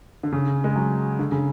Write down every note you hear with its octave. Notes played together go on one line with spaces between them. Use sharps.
D3
C#3
G#3
F#3
D3
C#3